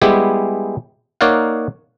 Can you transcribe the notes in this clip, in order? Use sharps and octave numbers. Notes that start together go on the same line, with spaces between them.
G3 G#3 B3 E4 G4 G#4
A#3 D#4 C#5 D5 F5 F#5